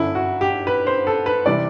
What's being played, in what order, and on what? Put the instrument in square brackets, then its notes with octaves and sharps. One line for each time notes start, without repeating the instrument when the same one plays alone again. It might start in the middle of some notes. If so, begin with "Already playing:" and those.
Already playing: [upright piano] G1 F#2 D3 E4
F#4
G4
B4
C5
A4
B4
C3 E3 G3 D5